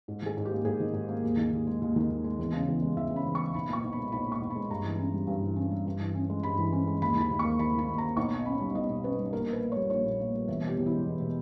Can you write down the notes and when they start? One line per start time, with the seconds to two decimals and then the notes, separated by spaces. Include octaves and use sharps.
0.08 G#2
0.22 D#3 G#4
0.37 G#2
0.45 G4
0.51 A#3
0.65 G#2 G#4
0.80 D#3
0.94 G#2
1.09 A#3
1.24 D#2
1.37 D#3
1.53 D#2
1.67 G#3
1.82 D#2
1.96 D#3
2.10 D#2
2.24 G#3
2.39 E2
2.53 C#3
2.68 E2
2.82 G#3
2.97 E2 E5
3.11 C#3
3.16 B5
3.26 E2
3.35 C#6
3.39 G#3
3.54 B1 B5
3.68 A#2 C#6
3.83 B1
3.93 B5
3.98 G#3
4.12 B1 B5
4.26 A#2
4.32 C#6
4.41 B1
4.50 B5
4.56 G#3
4.70 G2 A#5
4.84 E3
4.99 C#4
5.14 G3
5.27 G2
5.42 E3
5.56 C#4
5.71 G3
5.86 G2
6.00 E3
6.15 C#4
6.30 G#3
6.43 G2 B5
6.59 E3
6.73 C#4
6.87 G#3
7.02 D#2 B5
7.16 D#3
7.21 B5
7.31 D#2
7.39 C#6
7.44 A#3
7.59 D#2 B5
7.74 D#3 B5
7.88 D#2
7.98 A#5
8.03 A#3
8.17 B1 C#6
8.31 B2
8.45 C#4 B5
8.61 G3
8.75 B1 D#5
8.89 B2
9.04 C#4 B4
9.19 G3
9.33 A#1 A#4
9.47 A#2
9.53 B4
9.61 A#3
9.72 C#5
9.76 G3
9.90 A#1 C#5
10.04 A#2
10.19 A#3
10.34 G3
10.48 E2 E5
10.63 B2 G4
10.78 E2
10.86 E4
10.92 G#3
11.06 E2
11.20 B2